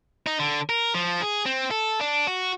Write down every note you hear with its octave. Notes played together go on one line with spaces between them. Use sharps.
D#4
D3
A#4
F3
G#4
C4
A4
D4
F#4